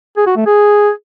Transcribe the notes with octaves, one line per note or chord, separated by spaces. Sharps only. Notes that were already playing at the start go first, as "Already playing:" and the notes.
G#4
F#4
A3
G#4